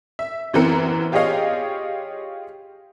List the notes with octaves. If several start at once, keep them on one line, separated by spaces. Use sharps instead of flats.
E5
F#2 E3 B3 C4 A#4 C#7
F4 G4 G#4 C#5 D#5 F5